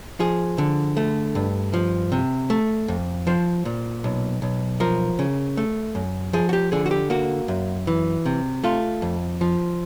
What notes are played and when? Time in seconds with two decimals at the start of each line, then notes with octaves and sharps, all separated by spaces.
0.20 F3 G#4
0.58 D3
0.97 A3
1.35 G2
1.74 F3
2.12 C3
2.50 A3
2.88 F2
3.27 F3 C5
3.65 A#2
4.04 B1
4.42 B1
4.80 F3 A#4
5.19 C#3
5.57 A3
5.95 F#2
6.33 F3 G#4
6.49 F#4
6.53 G4
6.72 D3 G#4
6.86 F#4
6.91 G4
7.10 A#3 F#4
7.48 F#2
7.87 E3
8.26 C3
8.64 A3 F4
9.02 F2
9.41 F3